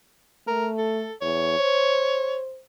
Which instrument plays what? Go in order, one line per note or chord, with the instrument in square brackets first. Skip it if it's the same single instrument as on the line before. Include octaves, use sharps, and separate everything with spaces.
[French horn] A3 [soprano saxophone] A#4
[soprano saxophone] A4
[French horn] E2 [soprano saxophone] C#5
[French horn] C5